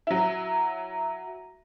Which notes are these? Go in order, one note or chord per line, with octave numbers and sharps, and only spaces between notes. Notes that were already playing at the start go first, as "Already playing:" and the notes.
F#3 E4